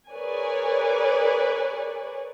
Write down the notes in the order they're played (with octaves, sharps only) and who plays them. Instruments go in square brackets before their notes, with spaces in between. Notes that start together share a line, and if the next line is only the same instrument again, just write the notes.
[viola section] G#4 A#4 B4 C#5 D5 G#5